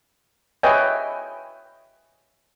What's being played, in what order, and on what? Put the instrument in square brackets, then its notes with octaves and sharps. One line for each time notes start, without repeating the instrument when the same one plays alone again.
[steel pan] B4 C#5 D#5 E5 G5 G#5